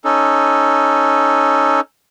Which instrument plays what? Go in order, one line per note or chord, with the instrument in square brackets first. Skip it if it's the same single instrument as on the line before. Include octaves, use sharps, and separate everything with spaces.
[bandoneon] C#4 D#4 A4